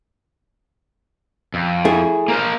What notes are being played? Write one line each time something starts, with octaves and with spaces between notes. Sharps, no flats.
F2
A3 E4 G#4
A#3 A#4 C5